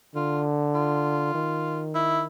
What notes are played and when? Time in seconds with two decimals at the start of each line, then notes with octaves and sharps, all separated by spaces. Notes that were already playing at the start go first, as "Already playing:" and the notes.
0.15 D3 F4
0.75 F4
1.35 D#3
1.95 E4